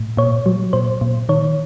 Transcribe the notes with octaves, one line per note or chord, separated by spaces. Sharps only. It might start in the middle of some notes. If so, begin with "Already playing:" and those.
Already playing: A2
A#2 C#5
F#3
A#2 C5
A#2
D#3 C#5